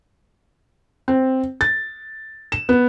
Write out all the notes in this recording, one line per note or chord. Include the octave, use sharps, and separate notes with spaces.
C4
A6
E7
B3